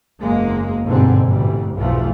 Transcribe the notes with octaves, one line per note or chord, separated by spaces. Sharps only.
F#1 E2 G#3 A#3
G1 G#2 B2 D3 C4
A1 D2 G2 E3 G3
B1 E2 E3 F3 A3